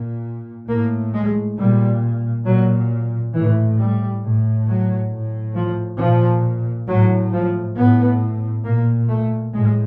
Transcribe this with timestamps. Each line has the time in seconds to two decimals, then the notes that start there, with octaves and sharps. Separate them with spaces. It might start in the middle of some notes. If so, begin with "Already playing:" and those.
Already playing: A#2
0.69 A2 A#3
1.13 G#3
1.58 A#2 G3
2.46 A#2 F#3
3.34 A2 E3
3.79 G3
4.23 A2
4.68 F#3
5.11 A2
5.55 F3
5.99 A#2 F3
6.88 A2 F#3
7.32 F3
7.77 A2 B3
8.65 A#2 A#3
9.09 A3
9.53 A2 G#3